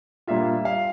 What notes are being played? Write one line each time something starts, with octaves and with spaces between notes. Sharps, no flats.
A#2 G3 A#3 D4 F4 E5
F5